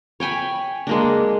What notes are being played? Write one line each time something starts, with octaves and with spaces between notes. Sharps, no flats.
C#5 G5 G#5 B5
G#3 A#3 D4